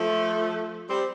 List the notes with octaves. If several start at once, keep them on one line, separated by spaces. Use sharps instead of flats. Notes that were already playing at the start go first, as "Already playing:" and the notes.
Already playing: F3 A3
G3 C4